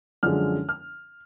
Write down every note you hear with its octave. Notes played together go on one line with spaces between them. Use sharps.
F#2 D3 F3 G#3 F6
F6